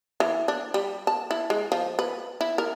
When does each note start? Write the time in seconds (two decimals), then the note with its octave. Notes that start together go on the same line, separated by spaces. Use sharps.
0.20 E3
0.48 D4
0.74 G3
1.07 A5
1.31 E4
1.50 G#3
1.72 F3
1.99 B4
2.41 E4
2.58 A#4